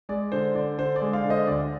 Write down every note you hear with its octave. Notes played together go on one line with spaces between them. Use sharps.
G#3 D5
D3 C5
D3 D5
D3 C5
D5
G#3
D5 F5
D3
C5 D#5
D2 D5